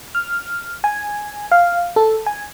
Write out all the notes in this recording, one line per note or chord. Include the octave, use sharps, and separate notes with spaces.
F6
G#5
F5
A4
G#5